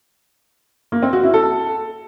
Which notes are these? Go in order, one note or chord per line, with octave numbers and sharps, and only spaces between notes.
A#3
C4
F#4
E4
A4